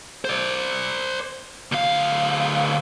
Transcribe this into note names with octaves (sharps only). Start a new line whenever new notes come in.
C5 D5
D2 F5